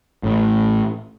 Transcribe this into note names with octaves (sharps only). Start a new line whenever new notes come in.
A1 A2